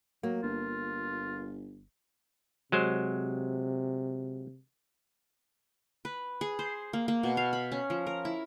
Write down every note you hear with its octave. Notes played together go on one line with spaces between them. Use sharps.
F#3 A#3
G1 F4
C3 F#3 G#3 C5
B4
G#4
C5
A#3
A#3
B2
F5
B5
C#4
F3
A#4
E4